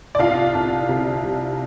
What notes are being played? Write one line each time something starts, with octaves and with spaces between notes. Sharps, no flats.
D5
C2 F4 F5
C2
C3
G3